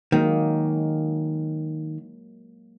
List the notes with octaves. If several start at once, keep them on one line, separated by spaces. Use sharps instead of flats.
D#3 F#3 G#3 A#3